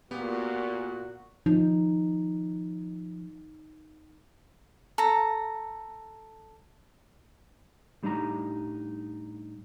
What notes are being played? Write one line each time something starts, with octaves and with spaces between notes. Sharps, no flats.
A#2 B3 F#4 G4
F3 D#4
A4 A#5
A2 G3 D4 D#4 G4 A#5